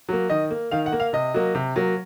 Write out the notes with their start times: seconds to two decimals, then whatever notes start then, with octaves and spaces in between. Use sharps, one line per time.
0.09 F#3 A#3
0.30 D#3 D#5
0.50 A#3
0.71 D#3 F5
0.86 F#5
0.92 A#3
1.00 F5
1.13 C3 D#5
1.34 F#3 A#3
1.55 C3
1.76 F#3 A#3